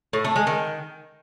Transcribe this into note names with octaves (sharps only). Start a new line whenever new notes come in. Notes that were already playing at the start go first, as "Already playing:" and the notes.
A2
A3
G#3
D#3